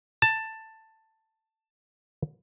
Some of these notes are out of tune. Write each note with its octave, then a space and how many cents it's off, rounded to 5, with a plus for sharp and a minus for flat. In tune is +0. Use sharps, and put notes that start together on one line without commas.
A5 +10